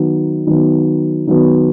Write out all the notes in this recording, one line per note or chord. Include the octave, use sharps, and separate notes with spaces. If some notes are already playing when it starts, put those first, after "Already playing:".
Already playing: D#3 F#3 B3
D#3 F#3 B3
D#3 F#3 B3